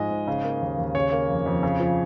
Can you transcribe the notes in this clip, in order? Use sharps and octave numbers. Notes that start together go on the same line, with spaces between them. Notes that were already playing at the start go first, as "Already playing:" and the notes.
Already playing: G#2 F3 G#3 D#5
G#2
C#3
A#3
D#2
D#2
C#3 C#5
A#3
F2
F2
C#3
F3